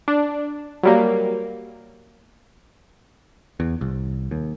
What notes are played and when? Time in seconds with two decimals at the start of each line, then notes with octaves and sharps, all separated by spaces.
0.08 D4
0.83 F#3 G3 A#3
3.60 E2
3.81 C2
4.31 D#2